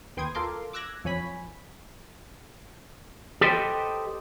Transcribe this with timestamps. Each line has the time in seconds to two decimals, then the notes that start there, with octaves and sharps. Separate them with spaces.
0.17 D#2 B4 G5 C6 D#6 G#6
0.35 F4 A4 A#4 C6 D6
0.73 D6 E6 F#6 G#6 A#6
1.04 F2 F3 C#5 G#5 B5 B6
3.41 G4 A4 B4 C5 D#5 G5